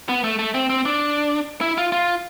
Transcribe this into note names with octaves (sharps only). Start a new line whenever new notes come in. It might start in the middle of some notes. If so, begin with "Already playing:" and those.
B3
A3
A3
C4
C4
D4
E4
F4
F4